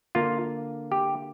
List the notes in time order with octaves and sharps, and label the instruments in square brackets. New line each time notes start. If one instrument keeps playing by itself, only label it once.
[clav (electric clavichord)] D3 A#3 D4 F4
G4